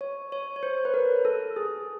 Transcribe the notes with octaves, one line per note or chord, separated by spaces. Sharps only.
C#5
C#5
C#5
C5
B4
A#4
A4
G#4